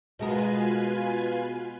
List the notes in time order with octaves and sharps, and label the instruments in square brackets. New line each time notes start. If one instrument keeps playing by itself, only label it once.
[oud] B2 G#3 A#4 [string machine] F4 B4 G#5